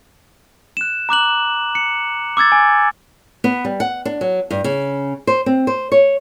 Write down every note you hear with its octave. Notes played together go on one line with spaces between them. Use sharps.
F#6 E7
A#5 D6 F#6 F#7
C#7
D6 E6 G#6 A6
G#5
B3
G3
F#5
D4
F#3
G2
C#3
C5
C4
C5
C#5